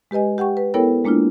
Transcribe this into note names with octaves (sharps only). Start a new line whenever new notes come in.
G#3 G4 B4 D#5 G#5
G4 F#5 G5 C#6
B4
B3 E4 A4 A#4 C#5 G5
G#3 A#3 D4 E4 F4